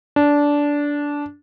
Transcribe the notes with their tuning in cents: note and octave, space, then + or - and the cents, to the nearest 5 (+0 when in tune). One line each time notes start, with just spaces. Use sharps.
D4 -15